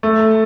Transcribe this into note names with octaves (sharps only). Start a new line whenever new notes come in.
A3